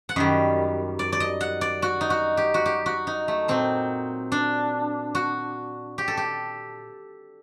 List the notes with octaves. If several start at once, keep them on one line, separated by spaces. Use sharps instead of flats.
F#5
F#2 D#3 G3 D#5
D5
D5
D#5
F#5
D5
F#4
D#4
F#4
G4
F#4
G4
F#4
D#4
A3
A#2 F#3 C4
D4
F#4
G4
A4
G4